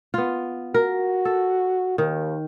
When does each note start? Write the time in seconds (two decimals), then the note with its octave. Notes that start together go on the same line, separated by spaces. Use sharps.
0.14 B3 F4
0.74 F#4 A#4
1.25 A4
1.98 D#2 D#3